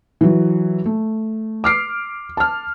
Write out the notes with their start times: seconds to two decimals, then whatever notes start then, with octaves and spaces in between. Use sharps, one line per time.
0.21 E3 F#3
0.85 A3
1.64 D6 F6 C7 D7
2.37 A5 F6